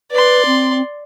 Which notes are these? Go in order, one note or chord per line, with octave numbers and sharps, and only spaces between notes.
B4 D5 C6
C4